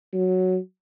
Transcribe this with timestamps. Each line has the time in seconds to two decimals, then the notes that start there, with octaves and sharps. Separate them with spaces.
0.13 F#3